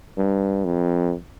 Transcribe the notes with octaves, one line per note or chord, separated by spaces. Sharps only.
G2
F2